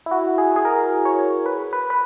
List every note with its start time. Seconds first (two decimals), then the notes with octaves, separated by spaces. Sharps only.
0.06 E4
0.11 F#4
0.38 G#4
0.56 G#4
0.65 A#4
1.05 C#5
1.46 B4
1.73 B4
1.90 B4